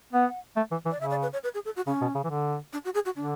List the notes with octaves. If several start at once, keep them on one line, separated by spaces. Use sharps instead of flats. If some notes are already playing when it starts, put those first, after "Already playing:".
B3 F#5
A3
E3
E3
D5
C#3 E5
D5
B4
C#5
B4
G#4
A4
F#4
C#3 C#4
B2
C#3
E3
D3
D4
F#4
G#4
F#4
D3 D4